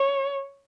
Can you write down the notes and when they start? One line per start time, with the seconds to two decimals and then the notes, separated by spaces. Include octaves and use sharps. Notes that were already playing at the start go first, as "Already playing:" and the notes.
Already playing: C#5